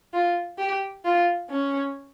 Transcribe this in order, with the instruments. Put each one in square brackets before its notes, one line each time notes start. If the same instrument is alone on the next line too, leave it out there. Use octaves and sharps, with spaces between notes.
[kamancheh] F4
G4
F4
C#4